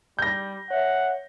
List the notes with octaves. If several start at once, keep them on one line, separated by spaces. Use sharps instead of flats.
G3 G6 A#6
C#5 E5 F#5